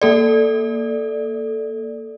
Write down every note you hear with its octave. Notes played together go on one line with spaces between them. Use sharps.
A#3 A4 D5